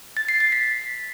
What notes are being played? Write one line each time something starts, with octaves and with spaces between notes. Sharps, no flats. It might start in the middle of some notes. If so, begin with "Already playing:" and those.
A6
C7
A6
B6